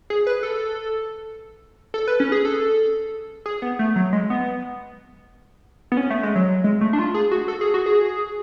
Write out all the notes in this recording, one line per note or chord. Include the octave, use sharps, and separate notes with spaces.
G#4
B4
A4
A4
B4
C#4
G#4
A4
G#4
B3
A3
F#3
G#3
B3
B3
C#4
A3
G#3
F#3
G#3
A3
D4
F4
G#4
F#4
A4
G#4
F#4
G#4